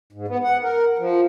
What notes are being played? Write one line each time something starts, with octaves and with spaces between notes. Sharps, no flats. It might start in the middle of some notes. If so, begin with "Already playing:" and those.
G#2
B3
F#5
A#4
F3